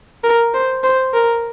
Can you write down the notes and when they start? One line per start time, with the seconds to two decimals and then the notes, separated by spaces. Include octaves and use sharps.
0.24 A#4
0.54 C5
0.84 C5
1.14 A#4